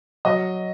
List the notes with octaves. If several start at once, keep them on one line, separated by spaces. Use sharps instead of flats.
F#3 D#5